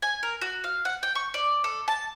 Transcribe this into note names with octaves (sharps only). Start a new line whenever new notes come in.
G#5
A#4
F#4
F5
F#5
G5
C#6
D5
A4
A5